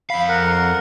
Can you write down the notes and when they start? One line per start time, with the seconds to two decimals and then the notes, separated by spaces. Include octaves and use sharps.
0.10 F2 F5 B5
0.29 A#4 F#5